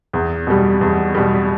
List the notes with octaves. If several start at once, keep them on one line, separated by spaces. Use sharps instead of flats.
E2
B2 G3
E2
B2 G3